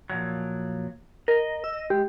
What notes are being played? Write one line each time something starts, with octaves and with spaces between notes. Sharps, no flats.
A#2 F3 F#3
A#4 D#5
E6
G#3 G4